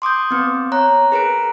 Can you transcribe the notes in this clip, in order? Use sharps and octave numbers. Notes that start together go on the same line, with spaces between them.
C6 D6 D#6 G6
B3 C4 B4
C#5 A#5 F#6
G#4 A#4 B4 A#5 F#6 D7